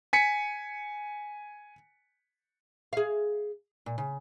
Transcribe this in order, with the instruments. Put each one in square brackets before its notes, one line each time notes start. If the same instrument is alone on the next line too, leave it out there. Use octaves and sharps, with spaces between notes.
[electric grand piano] G#5 B6 C#7
[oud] G#4 F5
A#2
C#3